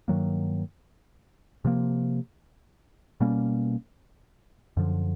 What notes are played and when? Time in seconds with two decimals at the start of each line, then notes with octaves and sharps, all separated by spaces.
0.08 G2 D#3 F#3 A#3
1.65 C3 F3 A#3
3.20 B2 G3 A#3 C#4
4.77 F#2 D3 F3